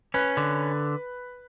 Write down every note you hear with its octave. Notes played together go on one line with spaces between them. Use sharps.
C#4 B4
D3